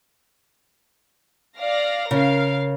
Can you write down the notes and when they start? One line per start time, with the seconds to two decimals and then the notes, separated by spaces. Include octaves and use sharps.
1.57 D5 F5 A#6
2.11 C#3 A#4 F5